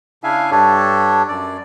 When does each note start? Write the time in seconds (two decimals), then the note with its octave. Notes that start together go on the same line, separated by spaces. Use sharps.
0.24 C#3 D4 E4 E5 F5 G#5
0.51 G2 D4 G4 A4 C#5
1.28 F#2 D5